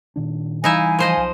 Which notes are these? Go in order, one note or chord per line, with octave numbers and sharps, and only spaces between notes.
A#2 D#3 D4
E3 G3 D#4 E4 E5 F5 G#5
F3 C5 D#5
B1